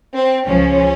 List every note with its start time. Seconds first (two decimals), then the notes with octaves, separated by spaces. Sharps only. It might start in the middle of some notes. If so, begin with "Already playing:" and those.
0.14 C4
0.46 C#2 C#3 F3 C#4